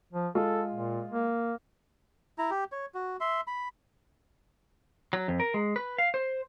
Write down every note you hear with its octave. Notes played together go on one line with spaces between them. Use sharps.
F3
G#3 F4 A4
A#2
A#3
E4 A#5
G4
C#5
F#4
E5 C6
B5
F#3
F2
A#4
G#3
B4
F5
C5